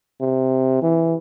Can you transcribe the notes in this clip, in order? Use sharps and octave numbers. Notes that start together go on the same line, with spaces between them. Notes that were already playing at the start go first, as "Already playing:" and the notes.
C3
E3